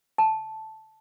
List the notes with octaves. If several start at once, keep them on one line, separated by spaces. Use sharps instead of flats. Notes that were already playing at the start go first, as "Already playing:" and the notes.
A5